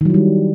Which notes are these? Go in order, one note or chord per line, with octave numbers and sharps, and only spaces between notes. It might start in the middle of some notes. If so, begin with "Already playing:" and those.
D#3 F#3 G3 E4